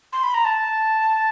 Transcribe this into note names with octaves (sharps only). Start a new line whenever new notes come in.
C6
B5
A#5
A5